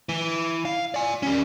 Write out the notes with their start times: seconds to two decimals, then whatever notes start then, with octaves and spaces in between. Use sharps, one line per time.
0.09 E3
0.65 F5
0.94 D5 G#5
1.23 G3 C#4